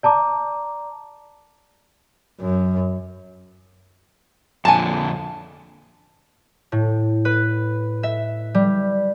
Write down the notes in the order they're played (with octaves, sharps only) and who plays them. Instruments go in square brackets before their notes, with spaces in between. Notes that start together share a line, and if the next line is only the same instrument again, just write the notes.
[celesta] D5 A5 A#5 D6
[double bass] F#2
[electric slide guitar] F2 A#2 D3 [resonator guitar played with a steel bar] G#5 A5
[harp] A2
B4
E5
G3